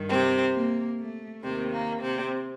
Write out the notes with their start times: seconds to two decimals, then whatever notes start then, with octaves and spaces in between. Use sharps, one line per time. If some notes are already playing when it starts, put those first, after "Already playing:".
Already playing: G2 D#3
0.11 C3 C4
0.55 A#3
0.98 A3
1.42 D#2 C3 D#3 C4
1.72 A#3
2.01 C3 C4